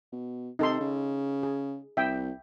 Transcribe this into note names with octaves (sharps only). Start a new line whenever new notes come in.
B2
C3 D#4 A4 C6
C#3
G#4
C2 E5 G5